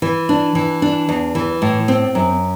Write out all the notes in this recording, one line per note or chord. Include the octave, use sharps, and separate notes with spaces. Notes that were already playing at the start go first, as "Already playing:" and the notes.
E3
D4
E3
D4
E2
E3
A2
C4
F#2